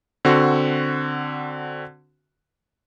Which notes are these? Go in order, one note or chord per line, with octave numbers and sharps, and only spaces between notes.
D3 C4 F#4 C#6